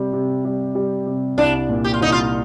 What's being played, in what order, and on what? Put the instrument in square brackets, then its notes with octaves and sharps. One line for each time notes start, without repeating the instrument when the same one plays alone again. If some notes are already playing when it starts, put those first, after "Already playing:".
Already playing: [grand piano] C3 G3
C3
G3
G3
C3
[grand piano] C2 [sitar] D4
[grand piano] A#2
[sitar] G4
F4
[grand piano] C2 [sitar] D#4
[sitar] F4